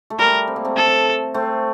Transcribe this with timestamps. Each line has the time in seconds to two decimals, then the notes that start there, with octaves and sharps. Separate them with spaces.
0.10 A3
0.19 G3 A#4
0.47 C4
0.56 A#3
0.65 A3 C4
0.77 A4
1.34 A3 C4